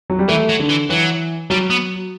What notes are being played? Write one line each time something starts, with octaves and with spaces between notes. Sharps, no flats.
F#3
G3
E3 A3
F#3
D3
E3
E3 F#3
F#3 G3
B3